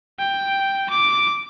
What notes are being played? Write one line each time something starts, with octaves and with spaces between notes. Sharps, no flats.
G5
D6